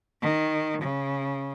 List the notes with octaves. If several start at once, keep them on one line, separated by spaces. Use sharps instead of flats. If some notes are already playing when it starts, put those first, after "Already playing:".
D#3
C#3